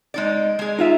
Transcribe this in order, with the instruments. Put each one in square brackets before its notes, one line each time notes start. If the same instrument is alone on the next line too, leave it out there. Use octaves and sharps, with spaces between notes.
[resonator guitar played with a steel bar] G#3 D#4 D5
G#3 G#4
[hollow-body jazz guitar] D#4 F4 E5